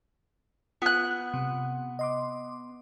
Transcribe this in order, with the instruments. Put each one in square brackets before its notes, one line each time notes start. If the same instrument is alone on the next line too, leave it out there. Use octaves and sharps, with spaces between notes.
[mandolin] B3 F#6 [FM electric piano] F4
[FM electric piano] C3
D#5 C6 D6